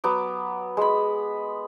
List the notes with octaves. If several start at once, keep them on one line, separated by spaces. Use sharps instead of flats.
F#3 B3 D6
G#3 B5